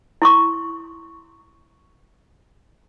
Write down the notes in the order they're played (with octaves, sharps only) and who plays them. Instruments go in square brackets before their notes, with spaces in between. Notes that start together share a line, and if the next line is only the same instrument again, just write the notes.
[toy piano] E4 C6 C#6